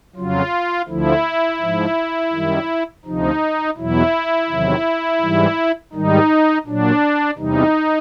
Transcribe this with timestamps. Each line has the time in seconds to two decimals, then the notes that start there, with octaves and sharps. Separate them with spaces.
0.16 F2 C#3 F#3 F4
0.88 D2 D3 F3 E4
1.61 G#2 F3
2.33 F#2 D#3 G3
3.05 D2 C3 F3 D#4
3.77 E2 B2 F#3 E4
4.49 E2 C3 D#3 F#3
5.21 G#2 E3 G3
5.93 G#2 D#3 G3 D#4
6.66 A#2 F#3 D4
7.38 E2 C3 E3 G3 D#4